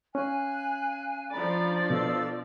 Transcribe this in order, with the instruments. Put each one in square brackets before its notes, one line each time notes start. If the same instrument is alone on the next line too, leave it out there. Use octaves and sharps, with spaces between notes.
[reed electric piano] C#4 [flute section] F5 G#5 F#6
[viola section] F3 D4 D5 [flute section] A#5 B5
[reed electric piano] B2 [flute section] A4 F5 E6